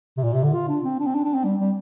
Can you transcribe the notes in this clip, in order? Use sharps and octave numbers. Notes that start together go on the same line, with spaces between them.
C3
A#2
C3
D3
F4
D4
C4
D4
C4
D4
D4
C4
G3
G3